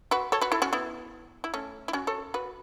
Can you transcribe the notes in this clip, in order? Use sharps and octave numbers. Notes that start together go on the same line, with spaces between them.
F#4 B4
A4 C#5
F#4 B4
E4 A4
C#4 F#4
B3 E4
E4
A3 C#4
E4
C#4 F#4
A4 C#5
F#4 B4